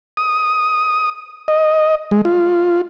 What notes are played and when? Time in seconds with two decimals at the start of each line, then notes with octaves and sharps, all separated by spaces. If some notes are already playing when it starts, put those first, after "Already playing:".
0.17 D#6
1.48 D#5
2.11 G#3
2.25 F4